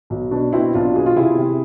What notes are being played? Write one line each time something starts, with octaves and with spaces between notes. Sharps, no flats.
B1
B2 D4
B2 C4 E4
B1 D4 F4
B2 G#4
F4
C3 E4 G#4
C3